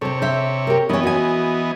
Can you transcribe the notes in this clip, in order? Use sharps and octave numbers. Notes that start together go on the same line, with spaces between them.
C3 A4 C5 C#5
C5 E5
G4 A#4
E3 B3 C#4 D#4 D#5
F#4 G#5